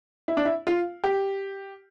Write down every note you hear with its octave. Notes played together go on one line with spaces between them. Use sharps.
E4
D4
E4
F4
G4